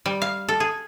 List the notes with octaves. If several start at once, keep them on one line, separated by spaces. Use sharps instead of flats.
G3
F5
A4
G#4